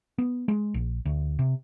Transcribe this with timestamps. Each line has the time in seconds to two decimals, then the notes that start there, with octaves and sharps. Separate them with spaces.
0.18 B3
0.48 G#3
0.74 A#1
1.05 D2
1.39 C3